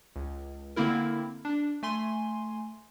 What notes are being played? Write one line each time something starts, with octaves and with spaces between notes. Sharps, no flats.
C#2
D3 A#3 C4 E4 A#4
D4
A3 G#5 C6